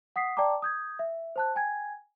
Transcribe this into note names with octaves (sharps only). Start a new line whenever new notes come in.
F#5 D#6 B6 C7
D5 G5 A5 A#5 D6
D#6 G6 G#6
E5
C5 A5 F#6
G5 G#5 G#6